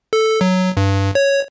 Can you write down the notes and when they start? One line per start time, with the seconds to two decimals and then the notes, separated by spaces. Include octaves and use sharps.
0.13 A4
0.41 F#3
0.77 G2
1.15 C#5